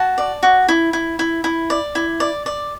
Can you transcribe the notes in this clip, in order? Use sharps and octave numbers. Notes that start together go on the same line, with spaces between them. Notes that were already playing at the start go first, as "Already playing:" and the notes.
Already playing: F#4 A5
D5
F#4
E4
E4
E4
E4
D5
E4
D5
D5